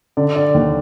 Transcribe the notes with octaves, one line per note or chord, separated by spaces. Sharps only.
D3 D5
D5
D#2